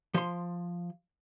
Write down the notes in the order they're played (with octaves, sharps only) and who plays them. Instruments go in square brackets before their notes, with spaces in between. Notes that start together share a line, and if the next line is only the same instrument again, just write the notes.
[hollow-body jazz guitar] F3 C6